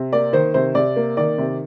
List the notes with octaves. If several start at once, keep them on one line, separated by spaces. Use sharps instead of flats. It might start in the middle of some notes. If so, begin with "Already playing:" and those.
Already playing: C3
A#3 D5
D#3 C5
C3 C5
C3 D5
A#3
D#3 D5
C3